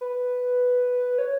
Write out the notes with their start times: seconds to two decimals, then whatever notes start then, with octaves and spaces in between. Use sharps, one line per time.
0.01 B4
1.18 C#5